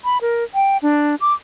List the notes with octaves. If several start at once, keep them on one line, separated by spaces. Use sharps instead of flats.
B5
A#4
G5
D4
D6